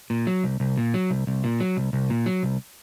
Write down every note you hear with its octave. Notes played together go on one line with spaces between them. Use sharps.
A#2
F#3
C2
C2
A#2
F#3
C2
C2
A#2
F#3
C2
C2
A#2
F#3
C2